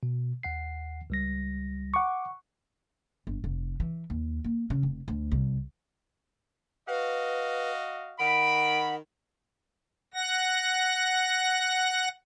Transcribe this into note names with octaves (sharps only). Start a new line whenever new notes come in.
B2
D#2 F#5 C7
C#2 G3 A#6
F#5 C#6 D6
G1
F1
E3
D#2
A#3
C#3
F1
D2
C2
F#4 B4 D#5 F5
D#3 F#5 B5 D7
F#5 A#6